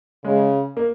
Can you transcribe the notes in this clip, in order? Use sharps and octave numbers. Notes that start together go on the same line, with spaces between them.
C#3 G#3
A#3